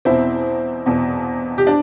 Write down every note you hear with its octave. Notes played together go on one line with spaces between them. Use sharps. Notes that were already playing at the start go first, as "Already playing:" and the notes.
E2 B2 C4 E4
E2 B2
G4
D4